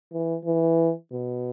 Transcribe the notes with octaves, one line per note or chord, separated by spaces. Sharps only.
E3
E3
B2